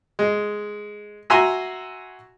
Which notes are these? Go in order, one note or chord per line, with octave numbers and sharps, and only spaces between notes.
G#3
F#4 E5 G#5 A#5 C6